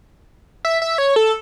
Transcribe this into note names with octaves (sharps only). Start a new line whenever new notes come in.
E5
E5
C#5
A4